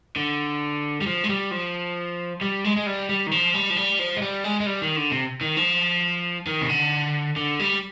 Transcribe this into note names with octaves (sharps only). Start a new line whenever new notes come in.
D3
G3
F3
G#3
G3
F3
G3
G#3
G#3
G3
G3
D#3
F3
G3
F3
G3
F3
G#3
G3
G#3
G#3
G3
D#3
D3
C3
D#3
F3
D#3
C3
D3
D3
G3